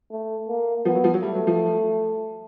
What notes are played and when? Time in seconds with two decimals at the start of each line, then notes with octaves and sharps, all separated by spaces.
0.11 A3
0.49 A#3
0.85 F3 B3
0.95 F#3
1.04 F3
1.14 F#3
1.22 G3 A3
1.35 F#3
1.47 F3